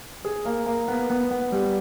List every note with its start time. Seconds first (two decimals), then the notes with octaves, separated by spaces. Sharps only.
0.25 G#4
0.45 A#3
0.66 A#3
0.88 B3
1.10 B3
1.31 B3
1.52 G3